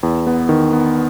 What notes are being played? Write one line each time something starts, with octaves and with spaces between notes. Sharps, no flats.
E2
B3
D#3
B3